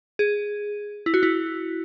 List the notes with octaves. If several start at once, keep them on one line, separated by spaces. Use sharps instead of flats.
G#4
E4
F#4
E4